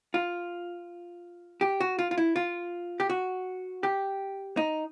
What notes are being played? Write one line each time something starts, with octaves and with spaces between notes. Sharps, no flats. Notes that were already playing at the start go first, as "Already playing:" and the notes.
F4
G4
F#4
F4
F4
E4
F4
G4
F#4
G4
D#4